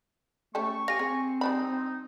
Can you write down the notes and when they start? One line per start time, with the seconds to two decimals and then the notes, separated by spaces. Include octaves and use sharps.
0.55 A3 C#4 G4 A4 C#6
0.88 G4 F5 G#5 A#6
0.99 C4 G#4
1.41 G3 D4 D#4 B5